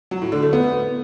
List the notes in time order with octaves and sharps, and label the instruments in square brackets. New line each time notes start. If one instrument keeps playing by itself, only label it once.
[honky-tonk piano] F#3
A2
D3
A3
B3